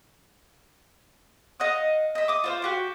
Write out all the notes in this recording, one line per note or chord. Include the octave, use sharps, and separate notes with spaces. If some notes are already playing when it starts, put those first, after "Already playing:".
D#5 F5 F#5 D#6
D#5 E5
D6 D#6
F4 C5 F5
F#4 G4 D6